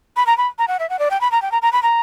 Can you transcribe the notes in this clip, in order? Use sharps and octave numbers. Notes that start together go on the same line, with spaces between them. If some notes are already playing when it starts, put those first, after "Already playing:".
B5
A#5
B5
A#5
F#5
E5
F#5
D5
G5
B5
A#5
G5
A#5
A#5
B5
A#5